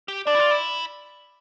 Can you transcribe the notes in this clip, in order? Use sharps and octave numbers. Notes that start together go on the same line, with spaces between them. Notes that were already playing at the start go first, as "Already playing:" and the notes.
G4
D4 D5
E4
F4
E4